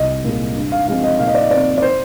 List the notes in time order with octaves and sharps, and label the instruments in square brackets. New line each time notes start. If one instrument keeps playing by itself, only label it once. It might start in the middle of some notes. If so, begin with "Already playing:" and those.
Already playing: [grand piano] C2 D#5
A#2 G#3
G2
F5
F3 G#3 C4 F5
D#5
A#2 F5
D#5
D5
D#5
F3 C4 D5
D5
C5